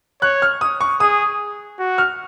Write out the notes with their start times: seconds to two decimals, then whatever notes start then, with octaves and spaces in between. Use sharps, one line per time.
0.22 C#5 F#6
0.42 F6
0.61 D#6
0.81 C#6
1.00 G#4 D#6
1.79 F#4
1.98 F6